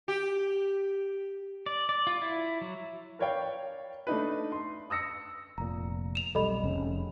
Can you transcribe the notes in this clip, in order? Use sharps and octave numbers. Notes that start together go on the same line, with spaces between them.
G4
D5
D5
F4
E4
F#3
A#4 B4 C#5 D5 F5 G5
A3 D4 D#4 B4
C6
D#6 E6 A#6 C#7
F1 A#2 A#5
E7 F7
F1 B1 G3 A4 D#5 B5
F1 C#3 C#4